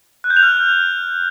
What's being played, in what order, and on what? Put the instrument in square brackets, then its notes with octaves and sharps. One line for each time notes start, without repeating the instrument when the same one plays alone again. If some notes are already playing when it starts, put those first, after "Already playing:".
[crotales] F#6
G6
F7
F6